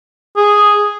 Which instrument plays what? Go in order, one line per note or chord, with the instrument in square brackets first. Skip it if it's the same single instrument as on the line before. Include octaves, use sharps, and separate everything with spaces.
[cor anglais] G#4